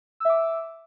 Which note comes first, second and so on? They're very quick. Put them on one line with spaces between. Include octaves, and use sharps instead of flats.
E6 E5 D6